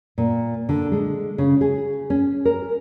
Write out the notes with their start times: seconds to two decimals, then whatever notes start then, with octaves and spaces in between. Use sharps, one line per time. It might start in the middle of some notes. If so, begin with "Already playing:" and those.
0.18 A#2
0.69 D3
0.92 G#3
1.38 C#3
1.61 G#4
2.10 C#4
2.45 A#4